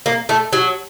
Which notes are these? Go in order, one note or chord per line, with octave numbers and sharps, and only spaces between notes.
A#3
A3
F#3